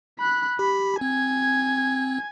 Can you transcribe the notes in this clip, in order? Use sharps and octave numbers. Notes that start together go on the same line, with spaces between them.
B5 F#6
G4 B5
C4 G#5 G#6